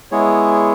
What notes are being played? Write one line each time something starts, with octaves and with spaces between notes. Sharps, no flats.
G#3 B3 E4 G#4 C#5